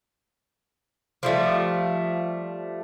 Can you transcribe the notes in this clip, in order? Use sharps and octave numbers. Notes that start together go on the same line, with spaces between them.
F3 G3 A3